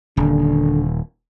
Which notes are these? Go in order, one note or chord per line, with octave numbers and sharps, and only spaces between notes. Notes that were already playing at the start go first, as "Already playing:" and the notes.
D#1 D3